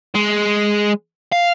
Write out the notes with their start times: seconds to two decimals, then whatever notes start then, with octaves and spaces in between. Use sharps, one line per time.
0.15 G#3
1.32 F5